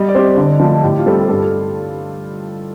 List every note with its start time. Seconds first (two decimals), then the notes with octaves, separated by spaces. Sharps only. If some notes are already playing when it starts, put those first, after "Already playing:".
Already playing: G3 D#5
0.08 D5
0.15 C4 G4 D#5
0.37 D3 D5
0.60 F3 A3
0.83 A2 G4
0.99 F4
1.06 G3 C4 A4
1.13 G4
1.29 G2 A4